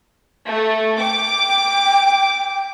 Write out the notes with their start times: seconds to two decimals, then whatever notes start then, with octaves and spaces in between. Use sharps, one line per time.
0.44 A3
1.00 G5 D6